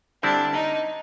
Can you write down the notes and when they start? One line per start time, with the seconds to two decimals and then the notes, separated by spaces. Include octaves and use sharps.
0.23 D3 G3 C4 D4 E4
0.54 D#4